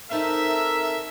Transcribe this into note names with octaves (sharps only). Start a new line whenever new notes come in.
C4 D#4 A4 A#4 E5 A5